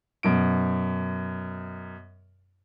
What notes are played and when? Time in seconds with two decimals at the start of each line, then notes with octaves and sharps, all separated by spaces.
0.23 F#2 B2 D7